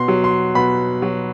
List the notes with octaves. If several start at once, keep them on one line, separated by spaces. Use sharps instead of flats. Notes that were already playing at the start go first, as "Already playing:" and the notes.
Already playing: B2 C6
F#3
C6
B2 B5
F#3